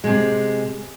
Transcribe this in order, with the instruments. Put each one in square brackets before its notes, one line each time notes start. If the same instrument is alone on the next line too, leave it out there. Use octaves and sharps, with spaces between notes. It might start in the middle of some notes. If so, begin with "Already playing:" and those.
[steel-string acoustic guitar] C3 G#3